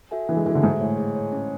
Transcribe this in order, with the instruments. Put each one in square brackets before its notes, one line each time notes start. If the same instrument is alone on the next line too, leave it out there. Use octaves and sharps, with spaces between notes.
[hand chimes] F#4 A4 E5 G#5
[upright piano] E3 [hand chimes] D4
[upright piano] G#3
[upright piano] E3 [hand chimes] F#4 A4 E5 G#5
[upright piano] D3
[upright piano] G#2 [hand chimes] G#4
[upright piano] A2 [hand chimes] C#5 G#5
[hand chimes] G#4
C#5 G#5
C#4